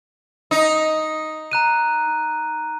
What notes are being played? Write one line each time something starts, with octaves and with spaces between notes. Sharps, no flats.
D#4
A#5 F#6 D#7